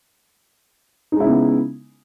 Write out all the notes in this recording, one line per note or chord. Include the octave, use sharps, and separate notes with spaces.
C#3 G#3 B3 D#4 E4